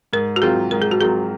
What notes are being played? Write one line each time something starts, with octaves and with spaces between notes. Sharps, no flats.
G#2 A#4
F#4
F#3 C4 F4 G#4 A#4
G#2 A#4
G#4
F#4
F#3 C4 F4 G#4 A#4